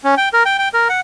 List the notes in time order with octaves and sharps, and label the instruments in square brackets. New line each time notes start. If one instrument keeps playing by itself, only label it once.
[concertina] C#4
G5
A#4
G5
G5
A#4
F#5